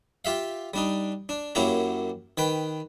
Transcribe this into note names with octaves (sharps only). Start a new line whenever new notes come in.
F4 G4 E5 F5
G3 D4 D#4
D4
F#2 F#3 A#3 E4 G4 A#5
D#3 B4 G5